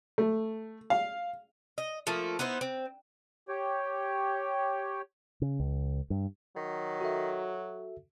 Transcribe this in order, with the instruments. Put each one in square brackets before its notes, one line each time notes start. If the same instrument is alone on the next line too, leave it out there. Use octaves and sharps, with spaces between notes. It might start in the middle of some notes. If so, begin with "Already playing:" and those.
[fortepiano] A3
F5
[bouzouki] D#5
F3 A3 A#3
B3 D#4 E4 C5
C4
[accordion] G4 C#5 G5
[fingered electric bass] C#3
C#2
G2
[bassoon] D#3 [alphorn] F#3
[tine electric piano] F#4 A4 E5